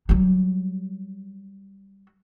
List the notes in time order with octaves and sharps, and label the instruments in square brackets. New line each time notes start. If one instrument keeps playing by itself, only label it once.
[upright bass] F#3 G3